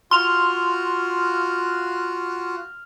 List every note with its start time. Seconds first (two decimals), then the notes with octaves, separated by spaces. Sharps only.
0.11 F4 F#4 C6 F6 F7